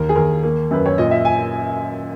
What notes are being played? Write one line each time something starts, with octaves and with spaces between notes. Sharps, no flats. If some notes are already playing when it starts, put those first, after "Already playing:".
Already playing: D#2 A#4
G#4
D#2 A#4
A#3
F#2 B4
C#5
A#2 D#5
E5
G#5